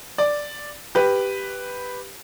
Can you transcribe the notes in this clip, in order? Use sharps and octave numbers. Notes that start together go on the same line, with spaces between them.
D5
G4 B4